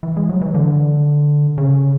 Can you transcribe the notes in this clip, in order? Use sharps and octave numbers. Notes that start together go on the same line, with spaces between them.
E3
G#3
F#3
E3
D3
C#3